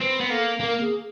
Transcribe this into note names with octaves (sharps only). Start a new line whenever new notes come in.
C4 B4
B3
A#3 A4
A#3 A#4
G#4